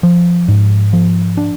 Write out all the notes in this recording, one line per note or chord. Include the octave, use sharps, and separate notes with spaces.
F3
G#2
F3
D4